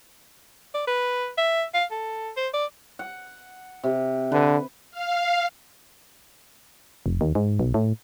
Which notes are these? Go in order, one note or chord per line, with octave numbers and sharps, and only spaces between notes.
D5
B4
E5
F5
A4
C5
D5
F#5
C3
D3 B4
F5
F1
D#2
G#2
B1
A2